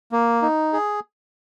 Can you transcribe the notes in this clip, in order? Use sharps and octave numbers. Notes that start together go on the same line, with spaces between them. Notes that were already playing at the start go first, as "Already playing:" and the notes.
A#3
D#4
G#4